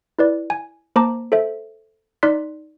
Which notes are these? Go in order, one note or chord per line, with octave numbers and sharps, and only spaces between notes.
E4 B4 D5
G#5
A#3 C5 A5 A#5 D6
A4 C5 E5
D#4 D5 C6 F#6 B6